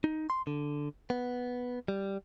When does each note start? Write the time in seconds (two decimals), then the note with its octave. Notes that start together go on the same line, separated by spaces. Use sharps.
0.04 D#4
0.30 C6
0.47 D3
1.10 B3
1.88 G3